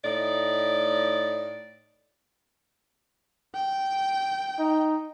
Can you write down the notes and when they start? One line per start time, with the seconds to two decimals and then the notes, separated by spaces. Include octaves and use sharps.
0.03 A2 D#4 D5
3.55 G5
4.59 D#4